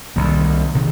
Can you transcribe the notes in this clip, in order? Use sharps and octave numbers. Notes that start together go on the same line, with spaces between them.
C2 C3 D#3 A#3
C3 D#3